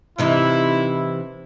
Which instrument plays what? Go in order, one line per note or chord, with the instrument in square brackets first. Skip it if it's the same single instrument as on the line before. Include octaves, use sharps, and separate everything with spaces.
[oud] C3 E3 D#4 [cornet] E4